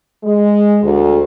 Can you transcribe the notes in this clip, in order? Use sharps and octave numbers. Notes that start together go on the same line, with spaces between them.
G#3
D2